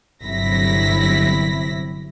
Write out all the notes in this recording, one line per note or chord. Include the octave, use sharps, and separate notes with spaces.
G1 C3 F#3 E4 A#6 B6